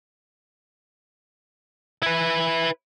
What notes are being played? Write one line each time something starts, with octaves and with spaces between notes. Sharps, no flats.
E4 B4